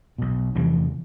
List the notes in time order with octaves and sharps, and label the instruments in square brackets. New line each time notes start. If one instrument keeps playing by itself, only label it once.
[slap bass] B1 B2
F1 E2 C3 E3 G3